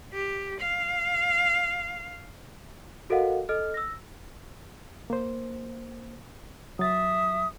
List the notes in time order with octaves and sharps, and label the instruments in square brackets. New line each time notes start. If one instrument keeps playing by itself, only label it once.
[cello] G4
F5
[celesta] F#4 A4 A#4 D#5 F5 F#5
A4 D#5 F6
E6 A#6
[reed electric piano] A#3 C5
[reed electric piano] F#3 A6 [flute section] E5 D#6